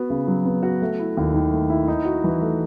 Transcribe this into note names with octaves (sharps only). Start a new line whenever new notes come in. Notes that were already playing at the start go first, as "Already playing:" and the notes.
Already playing: B3 F#4
C#3
F#3
B3
F#4
A3
E4
D#2
D#3
A3
E4
D#4
F#4
E3
A3